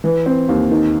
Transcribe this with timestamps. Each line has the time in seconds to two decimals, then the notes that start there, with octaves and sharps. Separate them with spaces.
0.04 E3
0.26 C4
0.49 D#2
0.71 D#3